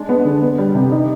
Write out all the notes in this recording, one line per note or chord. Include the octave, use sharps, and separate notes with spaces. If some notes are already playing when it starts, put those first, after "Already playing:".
Already playing: G#3 D4
B3
D3
B3
G3
C3
D#4